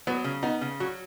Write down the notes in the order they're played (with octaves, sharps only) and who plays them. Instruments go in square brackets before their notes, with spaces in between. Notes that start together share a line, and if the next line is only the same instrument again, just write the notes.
[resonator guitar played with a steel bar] F#3 [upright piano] B3
[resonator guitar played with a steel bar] C#3
[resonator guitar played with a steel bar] B3 [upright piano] D#4
[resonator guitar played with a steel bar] C#3
[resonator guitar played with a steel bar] F#3 [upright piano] F#4